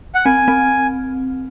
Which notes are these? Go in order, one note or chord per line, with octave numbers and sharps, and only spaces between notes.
F#5
C4 G#5
C4